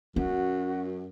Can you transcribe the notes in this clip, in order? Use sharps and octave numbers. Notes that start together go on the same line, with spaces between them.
F#2 C#4 F#4